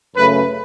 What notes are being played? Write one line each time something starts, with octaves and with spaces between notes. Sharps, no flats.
F#2 C#3 A3 B4